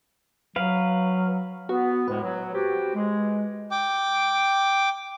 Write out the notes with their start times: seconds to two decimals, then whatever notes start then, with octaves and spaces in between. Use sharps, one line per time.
0.56 F#3 B4 F5
1.69 B3 F#4
2.08 D2 A2 G#3 B4
2.22 F#3
2.53 C4 F#4 G4
2.94 G#3
3.71 G5 D6